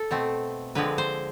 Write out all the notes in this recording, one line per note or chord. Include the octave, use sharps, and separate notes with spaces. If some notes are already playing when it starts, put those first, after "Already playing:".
Already playing: A4
B2 A3 C4
D3 F3 G#3 C4 B4
C5